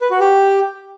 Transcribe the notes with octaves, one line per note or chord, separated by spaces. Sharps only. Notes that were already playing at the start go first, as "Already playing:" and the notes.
B4
F#4
G4